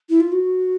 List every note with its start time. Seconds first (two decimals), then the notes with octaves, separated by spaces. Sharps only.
0.09 E4
0.20 F4
0.32 F#4